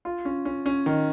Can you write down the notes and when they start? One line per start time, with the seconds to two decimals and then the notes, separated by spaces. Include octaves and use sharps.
0.05 F4
0.25 C#4
0.45 C#4
0.66 C#4
0.86 D#3